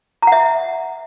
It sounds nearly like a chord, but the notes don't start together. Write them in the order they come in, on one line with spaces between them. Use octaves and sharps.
A#5 F#5 E5